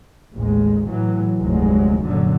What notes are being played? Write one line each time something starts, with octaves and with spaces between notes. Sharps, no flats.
A1 D#2 G#3
A2 E3 F#3
F1 D2 G#2 F#3 G#3
F#2 A#2 D3 F#3